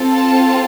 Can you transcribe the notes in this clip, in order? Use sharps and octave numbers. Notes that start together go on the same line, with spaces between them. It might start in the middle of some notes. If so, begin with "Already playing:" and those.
Already playing: C4 F4 A4
A5